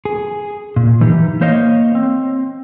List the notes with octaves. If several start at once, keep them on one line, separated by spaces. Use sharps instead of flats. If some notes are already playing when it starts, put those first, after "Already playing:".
G#4
A#2
E3 D#4 G4
A#3 C5 C#5 D#5 F5
C4